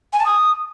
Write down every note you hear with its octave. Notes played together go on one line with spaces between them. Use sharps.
G#5
A5
D#6